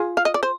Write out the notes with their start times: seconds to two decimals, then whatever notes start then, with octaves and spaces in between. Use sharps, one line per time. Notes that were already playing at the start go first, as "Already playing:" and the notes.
Already playing: F4 G#4
0.17 F5
0.25 D#5
0.34 D5
0.43 C5